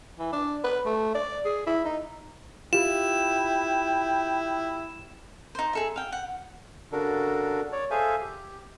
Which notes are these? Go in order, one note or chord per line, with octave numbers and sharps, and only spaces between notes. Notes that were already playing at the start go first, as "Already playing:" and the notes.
E3
D4
B4
A3
D5
G#4
E4
D#4
E4 F4 G4 G5 E7
D#4 C5
G#4 A4 E5
F5 G5
F#5
C#3 D4 F#4 A4 A#4
C#5 D5
G#4 A4 C5 E5 F5 G#5
G4